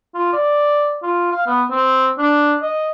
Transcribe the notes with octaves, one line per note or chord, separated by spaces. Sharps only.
F4
D5
F4
F5
B3
C4
D4
D#5